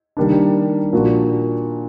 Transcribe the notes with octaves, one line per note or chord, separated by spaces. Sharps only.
D#3 G3 A#3 D4
A#2 F3 A#3 D4 F#4